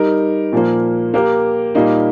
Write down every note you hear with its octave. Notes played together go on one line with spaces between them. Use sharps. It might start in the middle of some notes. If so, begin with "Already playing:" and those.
Already playing: G3 D#4 A#4
A#2 F3 A#3
A#3 G4 A#4
A#2 G3 A#3 D#4